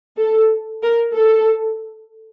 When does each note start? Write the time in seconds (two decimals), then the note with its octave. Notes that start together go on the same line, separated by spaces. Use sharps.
0.17 A4
0.82 A#4
1.14 A4